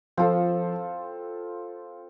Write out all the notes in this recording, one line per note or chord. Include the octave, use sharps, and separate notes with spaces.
F3 C4 F4 A4